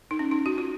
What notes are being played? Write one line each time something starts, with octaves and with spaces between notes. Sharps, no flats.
D#4
C#4
D#4
F#4
F4